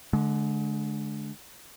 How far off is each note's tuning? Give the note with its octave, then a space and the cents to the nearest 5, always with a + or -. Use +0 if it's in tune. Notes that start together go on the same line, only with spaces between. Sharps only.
D3 -5 G#3 +35